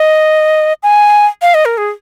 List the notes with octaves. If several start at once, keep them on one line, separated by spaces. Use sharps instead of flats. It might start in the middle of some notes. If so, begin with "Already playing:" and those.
Already playing: D#5
G#5
F5
D#5
A#4
G#4